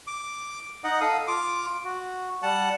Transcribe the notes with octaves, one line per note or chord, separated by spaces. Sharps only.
D6
D#4 D#5 F#5
A4 F5 D#6
F4 D6
F#4
G3 F#5 A5